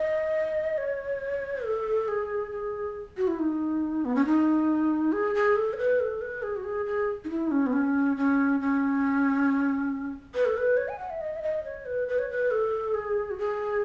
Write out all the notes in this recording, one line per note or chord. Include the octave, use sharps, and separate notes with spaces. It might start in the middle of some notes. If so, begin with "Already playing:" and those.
Already playing: D#5
C#5
A4
G#4
G#4
F#4
E4
D#4
B3
C#4
D#4
G#4
G#4
A4
C#5
B4
A4
B4
G#4
F#4
G#4
G#4
D#4
E4
D#4
C#4
B3
C#4
C#4
C#4
B4
A4
B4
C#5
G#5
F#5
E5
D#5
E5
D#5
C#5
B4
B4
C#5
B4
A4
G#4
F#4
G#4